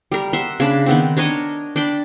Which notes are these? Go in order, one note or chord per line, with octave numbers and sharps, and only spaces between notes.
G3 A#4
E5 F#5 C6
C#3 D4 B5
D#3 B3 C4
D4 A#4 C#5 D#5
D4 D5 G5 B5